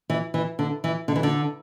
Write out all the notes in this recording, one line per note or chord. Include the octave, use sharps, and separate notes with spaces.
E3
E3
D3
E3
D3
E3
D3